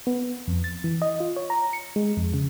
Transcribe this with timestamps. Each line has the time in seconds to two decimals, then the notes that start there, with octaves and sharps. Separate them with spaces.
0.07 B3
0.48 F2
0.64 A6
0.84 E3
1.02 D#5
1.20 F4
1.36 C#5
1.50 A#5
1.73 C#7
1.96 G#3
2.17 F2
2.34 C#3